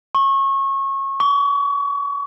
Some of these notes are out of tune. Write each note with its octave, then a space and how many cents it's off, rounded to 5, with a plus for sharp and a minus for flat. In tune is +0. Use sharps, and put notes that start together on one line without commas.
C#6 -25
C#6 +35